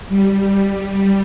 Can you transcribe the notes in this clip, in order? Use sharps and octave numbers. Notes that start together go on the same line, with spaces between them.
G3
G3